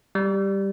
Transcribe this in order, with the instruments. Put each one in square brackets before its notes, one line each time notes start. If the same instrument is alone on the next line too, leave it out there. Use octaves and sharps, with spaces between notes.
[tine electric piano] G3